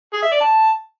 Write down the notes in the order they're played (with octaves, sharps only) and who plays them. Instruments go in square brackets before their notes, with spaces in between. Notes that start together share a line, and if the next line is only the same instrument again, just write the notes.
[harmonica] G#4
E5
D5
A5